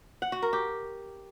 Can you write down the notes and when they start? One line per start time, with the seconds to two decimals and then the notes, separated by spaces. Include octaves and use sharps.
0.22 F#5
0.32 F#4
0.42 A#4
0.53 G4